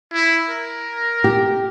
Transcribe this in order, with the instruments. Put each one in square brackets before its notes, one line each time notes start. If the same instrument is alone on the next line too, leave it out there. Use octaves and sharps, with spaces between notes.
[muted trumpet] E4
A#4
[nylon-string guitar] G4